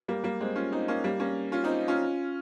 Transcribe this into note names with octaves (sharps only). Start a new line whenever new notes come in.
G3 A#3
G3 A#3
G#3 C4
C#4 F4
C4 D#4
A#3 C#4
G3 A#3
A#3 C#4
C#4 F4
C4 D#4
C#4 F4